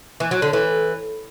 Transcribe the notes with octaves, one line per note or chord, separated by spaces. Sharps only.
E3
F#3
D3
E3